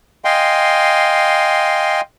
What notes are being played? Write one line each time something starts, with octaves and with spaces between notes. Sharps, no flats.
D#5 F5 G5 G#5 C6